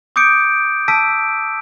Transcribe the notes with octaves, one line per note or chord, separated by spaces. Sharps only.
D6 D#6 G6 C#7 D7
A5 E6 B6 D7